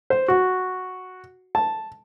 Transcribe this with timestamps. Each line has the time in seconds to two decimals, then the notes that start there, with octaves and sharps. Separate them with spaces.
0.10 C5
0.28 F#4
1.55 A5